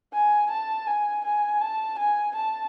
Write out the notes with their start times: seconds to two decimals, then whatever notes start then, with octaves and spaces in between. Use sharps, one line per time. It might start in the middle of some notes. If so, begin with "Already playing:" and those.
0.14 G#5
0.50 A5
0.87 G#5
1.25 G#5
1.61 A5
1.98 G#5
2.35 A5